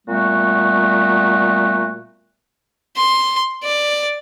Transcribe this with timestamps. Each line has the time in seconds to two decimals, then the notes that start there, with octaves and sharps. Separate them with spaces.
0.07 A#2 G3 A3 B3 F#4
2.97 C6
3.64 D5